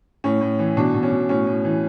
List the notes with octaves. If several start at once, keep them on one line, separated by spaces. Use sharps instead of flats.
A2 C#4
A2
E3
B2 D4
B2
C#4
B2
A2 C#4
A2
E3